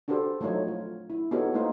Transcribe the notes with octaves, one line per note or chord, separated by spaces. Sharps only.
D4 F#4 G4 A4 C5
F3 F#3 A3 D#4 C#5
F4
E4
B3 D#4 F#4 G4 A4 C#5
A3 A#3 D#4 F4 C5